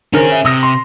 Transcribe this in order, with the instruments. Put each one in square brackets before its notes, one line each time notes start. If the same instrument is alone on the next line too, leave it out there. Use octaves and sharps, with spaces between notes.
[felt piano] D#3 A#4 C5 [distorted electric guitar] C#4 G#4
[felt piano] E5
[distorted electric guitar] C3 [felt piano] D#6 E6 A#6
[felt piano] C6